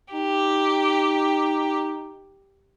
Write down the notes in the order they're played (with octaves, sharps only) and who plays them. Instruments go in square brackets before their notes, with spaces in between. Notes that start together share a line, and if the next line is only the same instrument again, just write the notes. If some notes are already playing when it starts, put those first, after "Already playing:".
[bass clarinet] D#4 [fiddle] G4